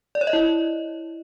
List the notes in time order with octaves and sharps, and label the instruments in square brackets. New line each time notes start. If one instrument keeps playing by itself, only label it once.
[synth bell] D5
C#5
D#5
E4